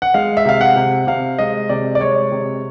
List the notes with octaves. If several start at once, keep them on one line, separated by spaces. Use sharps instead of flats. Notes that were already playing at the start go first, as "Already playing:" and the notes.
F#5
G#3 F5
E5
C3 F5
F#5
C3
C3 F5
G#3 D#5
C3 D5
D5
G#3 C#5
C3